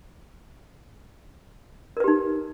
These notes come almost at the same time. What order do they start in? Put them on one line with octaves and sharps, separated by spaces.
A#4 B4 G4 D#4